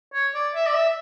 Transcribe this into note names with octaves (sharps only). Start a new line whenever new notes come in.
C#5
D5
E5
D5
E5